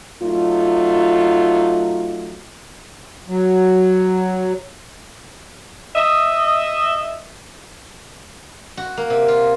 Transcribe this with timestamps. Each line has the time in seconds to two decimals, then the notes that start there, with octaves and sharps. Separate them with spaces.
0.23 F#3 A3 D#4 F4
3.28 F#3
5.96 D#5 E5
8.77 F#4
8.97 A#3
9.10 C3
9.28 F4